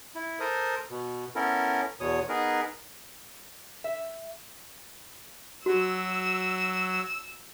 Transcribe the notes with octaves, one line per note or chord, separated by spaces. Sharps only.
E4
A4 A#4 C5 D#6
B2
B3 C#4 E4 A4 A#4
E2 B2 C#5 D#6
B3 D#4 G#4 A#4 B4
E5
F#3 F#4 E6